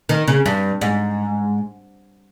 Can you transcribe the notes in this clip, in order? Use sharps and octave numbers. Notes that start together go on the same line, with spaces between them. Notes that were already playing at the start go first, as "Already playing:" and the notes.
D#3
C#3
G2
G#2